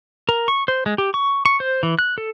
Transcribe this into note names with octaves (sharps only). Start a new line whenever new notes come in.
A#4
C#6
C5
G#3
G4
C#6
C#6
C5
E3
F#6
A4